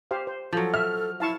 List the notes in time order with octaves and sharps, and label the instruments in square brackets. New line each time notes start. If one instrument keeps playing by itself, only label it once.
[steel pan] G4 C5 F5
C5
[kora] F3 F#3 [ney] A4
[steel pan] E5 [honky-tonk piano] F6
[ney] E4 [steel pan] F5 A5 C#6